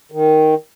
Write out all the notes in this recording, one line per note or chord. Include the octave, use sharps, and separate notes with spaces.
D#3